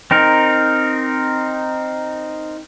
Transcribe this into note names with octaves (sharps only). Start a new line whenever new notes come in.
C4 D#4 A#4